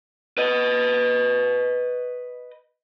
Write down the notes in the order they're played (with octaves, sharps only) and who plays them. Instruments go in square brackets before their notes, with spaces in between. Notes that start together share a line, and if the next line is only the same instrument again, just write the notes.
[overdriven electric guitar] B4 D#5